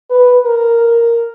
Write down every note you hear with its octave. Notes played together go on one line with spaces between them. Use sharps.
B4
A#4